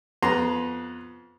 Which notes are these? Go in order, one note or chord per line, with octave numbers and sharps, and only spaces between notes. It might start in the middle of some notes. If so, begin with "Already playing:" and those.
F2 B3 A#5 C6